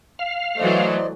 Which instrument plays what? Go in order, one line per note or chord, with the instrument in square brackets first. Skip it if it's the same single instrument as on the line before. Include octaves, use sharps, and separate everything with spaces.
[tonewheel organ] F5
[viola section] E3 F#3 A3 [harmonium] C5 D5 D#5